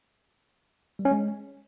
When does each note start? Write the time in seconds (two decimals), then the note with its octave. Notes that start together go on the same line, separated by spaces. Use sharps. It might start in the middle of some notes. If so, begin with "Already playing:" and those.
0.99 G3
1.05 C#4
1.11 G#3